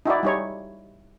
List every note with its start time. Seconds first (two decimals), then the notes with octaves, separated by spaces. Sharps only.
0.05 D#4 E4 F#4 D5
0.23 G3 D#4 C#5